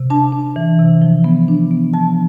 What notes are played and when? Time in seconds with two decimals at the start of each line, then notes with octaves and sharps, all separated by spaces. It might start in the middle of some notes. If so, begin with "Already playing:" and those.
Already playing: C3
0.10 D4 A5
0.32 D4
0.56 E3
0.79 C3
1.02 F3
1.24 B3
1.48 D4
1.71 B3
1.94 F3 A5